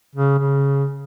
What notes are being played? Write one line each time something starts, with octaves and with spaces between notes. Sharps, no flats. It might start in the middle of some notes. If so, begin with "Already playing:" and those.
C#3
C#3